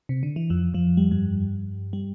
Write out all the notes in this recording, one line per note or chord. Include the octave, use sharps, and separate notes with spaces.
C3
D3
E3
F2 F3
F2 F3
G3
G2 G3
G3